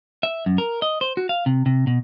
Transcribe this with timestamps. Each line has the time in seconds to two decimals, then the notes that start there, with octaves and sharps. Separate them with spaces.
0.23 E5
0.46 F#2
0.58 A#4
0.82 D#5
1.01 C5
1.17 F#4
1.29 F5
1.46 C3
1.66 C3
1.87 B2